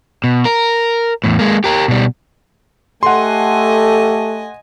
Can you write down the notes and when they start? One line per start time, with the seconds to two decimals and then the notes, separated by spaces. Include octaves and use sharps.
0.24 B2
0.45 A#4
1.24 E2 A2
1.39 G#3 A#3
1.64 G4 A#4
1.88 B2 G3
3.03 A3 G4 A4 D#5 F#5 G#5 C6